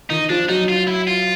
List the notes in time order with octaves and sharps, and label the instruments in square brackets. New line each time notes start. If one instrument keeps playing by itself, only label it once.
[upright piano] D#3 [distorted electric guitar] D#4
[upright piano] F3 [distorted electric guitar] D4
[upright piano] F#3 [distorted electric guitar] D#4
[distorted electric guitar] F4
E4
F4